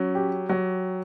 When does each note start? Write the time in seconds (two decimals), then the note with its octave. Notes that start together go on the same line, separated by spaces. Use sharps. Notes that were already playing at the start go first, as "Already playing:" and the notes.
Already playing: F#3 C#4
0.15 G4
0.49 F#3